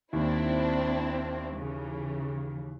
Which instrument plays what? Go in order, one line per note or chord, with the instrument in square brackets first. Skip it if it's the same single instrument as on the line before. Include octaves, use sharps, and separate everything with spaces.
[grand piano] D#2 [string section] C4 D4 E4
[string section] C#3 E3